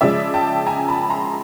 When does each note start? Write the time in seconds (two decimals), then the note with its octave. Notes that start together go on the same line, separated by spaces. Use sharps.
0.01 C#3 F3 G#3 D5 E5
0.34 G5 A5
0.67 G#5 A#5
0.88 A5 B5
1.10 A#5 C6